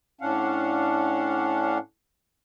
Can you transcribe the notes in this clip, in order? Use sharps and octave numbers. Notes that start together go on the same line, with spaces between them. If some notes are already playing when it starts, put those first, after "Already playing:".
A2 C#4 D4 F5 F#5